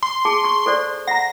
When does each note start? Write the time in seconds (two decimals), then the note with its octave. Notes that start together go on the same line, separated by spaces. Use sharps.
0.03 C6
0.25 G#4 A5 D6
0.44 C#6
0.66 A4 C5 D5
1.07 F#5 A#5 A#6